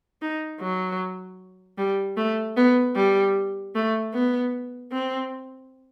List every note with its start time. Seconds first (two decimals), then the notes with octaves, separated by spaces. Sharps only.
0.22 D#4
0.60 F#3
1.78 G3
2.17 A3
2.57 B3
2.96 G3
3.75 A3
4.14 B3
4.92 C4